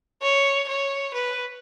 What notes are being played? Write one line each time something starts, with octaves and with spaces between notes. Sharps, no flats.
C#5
C#5
B4